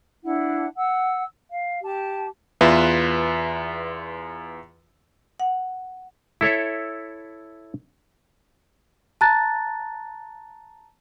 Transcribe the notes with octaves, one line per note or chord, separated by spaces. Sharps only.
D4 E4 F#5
F#5 E6
F5
G4 A5
E2 F4 B4 E5
F#5
E4 A4 C#5 E5
A5 A#5 F#6 A6